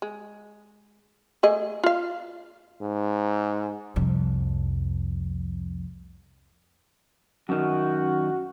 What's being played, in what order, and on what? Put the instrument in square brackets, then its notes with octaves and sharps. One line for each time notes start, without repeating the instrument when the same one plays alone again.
[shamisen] G#3
A3 G#4 D#5
F4 F5
[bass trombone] G#2
[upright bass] C2 F2
[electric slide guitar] F#2 D#3 [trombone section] F#4